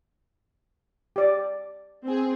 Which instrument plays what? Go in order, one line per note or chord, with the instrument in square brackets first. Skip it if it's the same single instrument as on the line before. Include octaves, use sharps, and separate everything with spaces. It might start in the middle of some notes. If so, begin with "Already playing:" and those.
[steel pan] G4 D5
[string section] C4 G#4